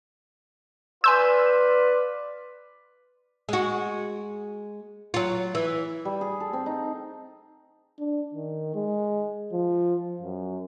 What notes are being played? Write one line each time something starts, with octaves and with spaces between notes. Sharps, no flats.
F4 B4 D5 G#5 C6 E6 G6
G#3 F#4
F#3 F4
E3
G3
G#4
A4
C4
D#4
D4
D#3
G#3
F3
F#2